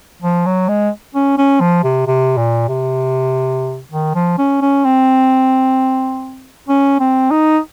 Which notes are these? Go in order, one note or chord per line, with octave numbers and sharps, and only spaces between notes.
F3
F#3
G#3
C#4
C#4
F3
C3
C3
A#2
C3
D#3
F3
C#4
C#4
C4
C#4
C4
D#4